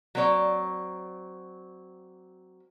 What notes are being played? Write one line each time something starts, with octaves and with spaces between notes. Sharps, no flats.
F#3 A#3 C4 C#5 D5